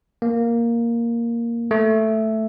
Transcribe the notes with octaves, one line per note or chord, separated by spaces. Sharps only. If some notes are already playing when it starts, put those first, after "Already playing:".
A#3
A3